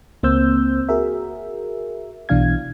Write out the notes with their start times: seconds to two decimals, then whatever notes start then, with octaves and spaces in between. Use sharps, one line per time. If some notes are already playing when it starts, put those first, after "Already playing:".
0.23 C#2 A#3 C4 C5 E6 G6
0.89 F#4 G#4 A#4 E5
2.29 B1 B2 E3 D4 F5 G#6